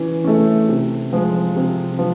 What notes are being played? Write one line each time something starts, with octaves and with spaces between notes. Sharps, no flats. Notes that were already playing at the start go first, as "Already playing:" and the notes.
Already playing: E3 C#4
A3 C#4
C3
F3 G#3
C3
F3